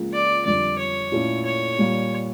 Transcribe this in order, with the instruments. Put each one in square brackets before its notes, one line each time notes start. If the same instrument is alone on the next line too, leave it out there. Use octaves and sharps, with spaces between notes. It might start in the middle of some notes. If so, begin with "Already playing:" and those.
Already playing: [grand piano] C#2 C#3 F3 A#3
[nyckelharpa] D5
[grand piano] F2 D3 G3 [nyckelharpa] D5
[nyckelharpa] C#5
[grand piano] A#2 A3 C#4 E4 A4
[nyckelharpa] C#5
[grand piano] A#2 G3 A#3